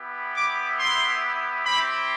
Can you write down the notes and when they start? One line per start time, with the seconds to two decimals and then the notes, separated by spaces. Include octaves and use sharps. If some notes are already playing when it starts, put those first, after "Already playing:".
Already playing: B3 E4 G4
0.35 D6
0.79 C6
1.66 C4 E4 G4 B5